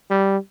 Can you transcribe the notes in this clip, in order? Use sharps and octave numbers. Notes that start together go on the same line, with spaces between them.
G3